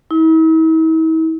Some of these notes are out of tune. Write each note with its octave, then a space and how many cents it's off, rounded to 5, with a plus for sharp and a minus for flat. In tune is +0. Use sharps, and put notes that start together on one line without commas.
E4 -45